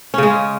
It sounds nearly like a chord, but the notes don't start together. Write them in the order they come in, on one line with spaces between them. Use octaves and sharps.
C#4 C#3 G#3